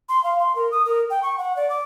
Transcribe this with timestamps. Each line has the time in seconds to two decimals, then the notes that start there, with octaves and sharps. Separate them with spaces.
0.09 C6
0.24 F5
0.39 C6
0.55 A#4
0.71 D#6
0.85 A#4
1.10 G5
1.23 C#6
1.38 F#5
1.56 D5
1.70 D6